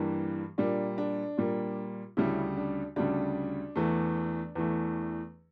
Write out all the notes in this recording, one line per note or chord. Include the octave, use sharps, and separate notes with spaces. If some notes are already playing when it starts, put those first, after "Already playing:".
Already playing: G2 E3 G3 A#3
A#2 G3 A#3 D4
D4
A#2 G3 A#3
D2 C#3 G3 C#4 E4
D4
D2 C#3 G3 D4
E2 E3 A3
E2 E3 A3